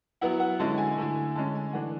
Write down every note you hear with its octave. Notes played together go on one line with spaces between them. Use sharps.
F#3 B3 E4 F#5
F#5
D3 G#3 C#4 E4 A5
G#5
D3 A3 E4
D3 G#3 C#4 A5
G#5
E3 A3 D4 F#5